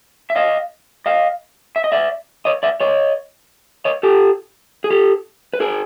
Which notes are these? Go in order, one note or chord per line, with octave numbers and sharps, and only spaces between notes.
E5
D#5 F5
D#5 F5
E5
D#5
D5 E5
C#5 D#5
D5 E5
C#5 D#5
C#5 D#5
G4 A4
G#4
G4 A4
B4
G#4 A#4